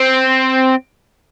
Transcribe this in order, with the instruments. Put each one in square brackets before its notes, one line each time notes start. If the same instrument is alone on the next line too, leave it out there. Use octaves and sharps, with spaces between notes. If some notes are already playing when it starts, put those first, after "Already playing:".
Already playing: [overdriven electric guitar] C4